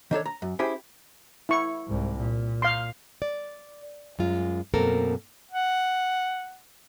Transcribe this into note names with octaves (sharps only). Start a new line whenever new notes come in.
D#3 D4 A4 C#5
A#5
F#2
C#4 E4 G4 G#4 C5 G5
E4 C#6
C2 G#2
A#2
F5 C6
D5
F#2 G#3 F4
F#2 B2 A#3 C4 A4 A#4
F#5